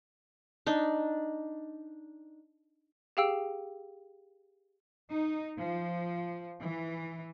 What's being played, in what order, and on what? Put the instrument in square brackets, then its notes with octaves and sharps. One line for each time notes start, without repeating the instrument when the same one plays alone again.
[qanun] D4 D#4
[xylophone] G4 G#4 F5 G5 E6 D7
[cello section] D#4
F3
E3